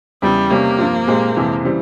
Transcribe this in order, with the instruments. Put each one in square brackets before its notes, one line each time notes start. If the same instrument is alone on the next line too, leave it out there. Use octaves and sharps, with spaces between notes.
[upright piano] E2 C#3 E3 [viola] G3
[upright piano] C3 G3 C#4 G4 [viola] A#3
[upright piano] G2 F3 C4 F4
A#2 G#3 C4 G4
F2 C3 E3 G#3
C#3 E3 G3 C4